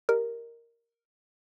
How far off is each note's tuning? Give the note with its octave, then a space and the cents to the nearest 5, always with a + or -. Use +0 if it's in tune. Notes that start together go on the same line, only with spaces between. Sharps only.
G4 +0 A#4 +0 D#5 -25